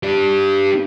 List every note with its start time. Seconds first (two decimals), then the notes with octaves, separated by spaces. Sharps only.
0.03 D4 G4